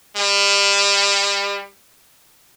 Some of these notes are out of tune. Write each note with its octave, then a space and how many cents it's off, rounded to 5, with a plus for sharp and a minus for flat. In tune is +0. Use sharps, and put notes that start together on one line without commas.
G3 +35